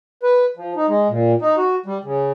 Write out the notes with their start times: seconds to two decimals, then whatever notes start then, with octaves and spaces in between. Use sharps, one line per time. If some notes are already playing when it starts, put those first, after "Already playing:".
0.23 B4
0.57 F3
0.76 D#4
0.88 G#3
1.09 A#2
1.42 D#4
1.57 F#4
1.86 G3
2.04 C#3